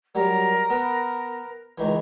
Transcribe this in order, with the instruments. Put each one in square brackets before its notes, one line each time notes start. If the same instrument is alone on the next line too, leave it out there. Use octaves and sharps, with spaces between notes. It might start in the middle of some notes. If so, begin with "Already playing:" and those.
[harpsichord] F#3 G3 [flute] A#4
[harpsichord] B3 B4
C#2 D#3 E3